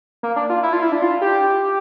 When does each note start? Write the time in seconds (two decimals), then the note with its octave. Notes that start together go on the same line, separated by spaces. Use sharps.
0.23 A#3
0.36 D4
0.50 F4
0.63 E4
0.73 F4
0.82 E4
0.92 D4
1.02 F4
1.21 G4